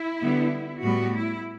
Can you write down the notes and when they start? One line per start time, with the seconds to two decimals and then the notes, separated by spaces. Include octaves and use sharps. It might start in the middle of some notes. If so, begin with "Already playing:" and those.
Already playing: E4
0.22 D3 G3 B3
0.83 A2 G3 B3 F#4
1.14 E4